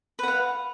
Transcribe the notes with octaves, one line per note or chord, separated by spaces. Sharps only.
B4 F5 F#5